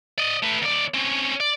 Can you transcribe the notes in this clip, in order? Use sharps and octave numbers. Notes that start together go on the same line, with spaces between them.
D5 D#5
A3 B4
D#2 D5
C4 C#4
D5